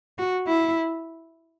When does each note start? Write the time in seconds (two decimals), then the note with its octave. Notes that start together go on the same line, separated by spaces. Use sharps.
0.18 F#4
0.47 E4